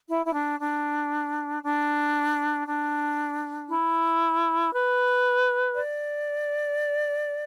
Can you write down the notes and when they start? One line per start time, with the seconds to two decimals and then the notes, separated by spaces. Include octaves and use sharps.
0.09 E4
0.26 E4
0.34 D4
0.59 D4
1.63 D4
2.67 D4
3.69 E4
4.72 B4
5.75 D5